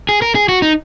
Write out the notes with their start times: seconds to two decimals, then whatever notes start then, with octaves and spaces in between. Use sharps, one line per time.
0.09 G#4
0.22 A#4
0.35 G#4
0.49 F#4
0.62 D#4